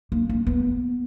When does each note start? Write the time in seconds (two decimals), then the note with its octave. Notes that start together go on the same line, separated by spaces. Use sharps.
0.12 A#3
0.29 A#3
0.47 B3